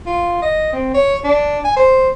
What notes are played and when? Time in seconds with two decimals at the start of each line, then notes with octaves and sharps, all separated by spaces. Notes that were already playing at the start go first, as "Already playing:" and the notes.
0.06 F4
0.42 D#5
0.72 C4
0.94 C#5
1.23 D4
1.64 G#5
1.76 C5